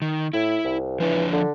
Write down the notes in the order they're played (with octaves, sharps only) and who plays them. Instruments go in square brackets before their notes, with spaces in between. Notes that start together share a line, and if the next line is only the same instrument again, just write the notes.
[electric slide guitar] D#3
[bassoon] A2 [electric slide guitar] E4
[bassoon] C2
[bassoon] E3 [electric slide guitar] F3 D4 C#5
[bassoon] D3